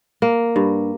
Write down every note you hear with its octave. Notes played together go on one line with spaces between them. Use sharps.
A#3
G2